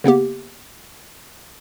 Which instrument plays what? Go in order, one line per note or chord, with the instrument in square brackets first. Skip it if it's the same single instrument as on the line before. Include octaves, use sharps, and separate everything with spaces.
[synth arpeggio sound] C#3 A#3 B3 G4